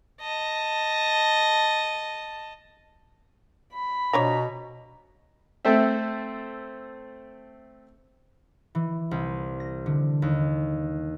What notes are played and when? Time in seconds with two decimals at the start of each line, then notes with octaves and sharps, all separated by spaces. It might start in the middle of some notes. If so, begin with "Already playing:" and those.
0.21 D#5 A5
3.73 B5
4.13 B2 F3 D4 C#5 A#5
5.65 A3 C4 A4 C5 E5
8.75 E3
9.11 C2
9.60 A#6
9.86 D3
10.22 D#2